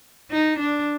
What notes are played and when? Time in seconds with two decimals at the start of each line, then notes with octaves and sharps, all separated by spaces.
0.31 D#4
0.59 D4